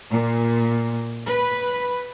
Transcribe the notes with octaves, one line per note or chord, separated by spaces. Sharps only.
A#2
B4